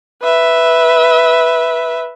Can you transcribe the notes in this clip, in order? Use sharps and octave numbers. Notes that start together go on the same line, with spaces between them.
B4 E5